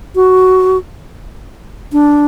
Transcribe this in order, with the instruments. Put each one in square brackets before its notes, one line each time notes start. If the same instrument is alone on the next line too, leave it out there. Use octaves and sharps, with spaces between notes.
[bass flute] F#4
D4